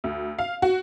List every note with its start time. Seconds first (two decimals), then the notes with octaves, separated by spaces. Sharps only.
0.04 D2
0.39 F5
0.62 F#4